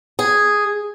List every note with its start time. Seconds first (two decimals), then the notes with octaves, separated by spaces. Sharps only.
0.19 G#4